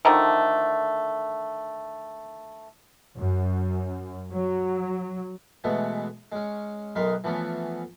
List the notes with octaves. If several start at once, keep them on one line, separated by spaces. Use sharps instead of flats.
D3 D#3 F3 A3
F#2
F#3
B2 E3 G#3 A3 B3
G#3 C#4
B1 F#2 A#4 B4 D#5 C6
E3 F3 A3 B3 C#4